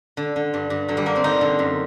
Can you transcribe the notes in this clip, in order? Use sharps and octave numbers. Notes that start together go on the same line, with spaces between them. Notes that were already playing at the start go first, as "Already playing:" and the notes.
D3
D3
G2
G2
D3 F#3
G3
D3 A#3
C4
D3 D#4
D3
F#2